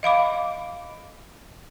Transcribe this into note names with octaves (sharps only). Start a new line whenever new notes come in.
D#5 F5 B5 D6